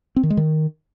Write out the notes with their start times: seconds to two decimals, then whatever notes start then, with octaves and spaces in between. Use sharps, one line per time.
0.16 C4
0.23 D#3
0.30 G#3
0.37 D#3